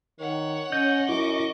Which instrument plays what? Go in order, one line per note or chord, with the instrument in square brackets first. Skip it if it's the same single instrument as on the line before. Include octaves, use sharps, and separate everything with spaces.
[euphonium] D#3 [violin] C#5 F#5
[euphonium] C#4 [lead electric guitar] D#5 [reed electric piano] G6
[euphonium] F#2 [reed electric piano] E4 [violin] C#6 D6